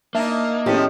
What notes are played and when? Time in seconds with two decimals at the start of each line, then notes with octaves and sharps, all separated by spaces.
0.15 A#3 D4 D#4 E5
0.66 A2 D#3 F3 G#3 B3 C#4 G4